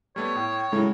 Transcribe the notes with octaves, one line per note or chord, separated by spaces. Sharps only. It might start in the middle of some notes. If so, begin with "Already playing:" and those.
G3 A3 B3 C#5
A2 G5
A2 C#3 F#3 G#3